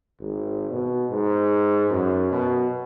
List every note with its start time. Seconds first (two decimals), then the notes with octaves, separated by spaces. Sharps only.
0.20 G#1
0.71 B2
1.11 G#2
1.90 F#2
2.31 B2